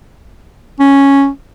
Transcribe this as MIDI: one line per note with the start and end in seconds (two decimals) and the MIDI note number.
0.79 1.29 61